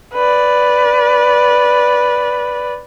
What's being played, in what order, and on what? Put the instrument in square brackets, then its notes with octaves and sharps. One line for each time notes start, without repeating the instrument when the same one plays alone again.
[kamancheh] B4 D5